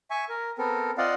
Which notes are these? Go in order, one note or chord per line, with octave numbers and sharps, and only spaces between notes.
E5 G#5 C#6
A#4
B3 C4 A4 A#4
C4 F4 D5 D#5 F5 F#5